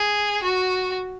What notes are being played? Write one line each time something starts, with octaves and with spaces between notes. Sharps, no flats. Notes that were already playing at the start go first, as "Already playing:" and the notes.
Already playing: G#4
F#4